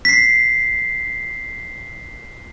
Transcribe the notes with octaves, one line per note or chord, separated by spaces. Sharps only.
B6 C7